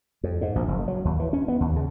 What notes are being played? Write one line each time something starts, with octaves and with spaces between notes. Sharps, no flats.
F2
G#2
A#1
F#1
F#3
D#2
E3
C#4
B3
D#2
C#3